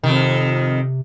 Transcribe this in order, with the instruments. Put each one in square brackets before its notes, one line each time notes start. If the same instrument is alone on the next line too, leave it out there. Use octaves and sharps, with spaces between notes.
[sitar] F2 D#3 [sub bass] C3